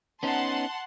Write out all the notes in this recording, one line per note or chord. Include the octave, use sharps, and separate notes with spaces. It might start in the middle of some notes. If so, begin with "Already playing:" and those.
B3 C#4 D#4 F#5 A5 C6